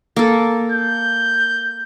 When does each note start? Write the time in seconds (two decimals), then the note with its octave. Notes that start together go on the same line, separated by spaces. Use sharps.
0.16 A#3 A4
0.72 G6